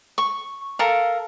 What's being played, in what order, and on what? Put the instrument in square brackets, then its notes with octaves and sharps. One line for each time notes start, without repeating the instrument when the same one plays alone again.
[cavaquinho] C#6
A4 A#4 F5